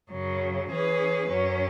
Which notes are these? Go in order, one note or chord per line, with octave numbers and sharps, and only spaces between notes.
F#2 C#3 F#3
E3 C#4 G#4 B4
F#2 F#3 C#4